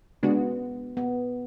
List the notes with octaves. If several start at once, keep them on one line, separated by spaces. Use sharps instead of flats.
C#3 G#3 B3 D4 F#4
B3